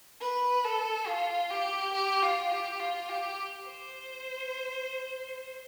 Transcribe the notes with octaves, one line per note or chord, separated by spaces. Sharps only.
B4
A4
F4
G4
G4
F4
G4
F4
G4
C5